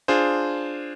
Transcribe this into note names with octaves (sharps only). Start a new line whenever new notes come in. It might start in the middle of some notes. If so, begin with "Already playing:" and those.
D4 F4 G#4 C5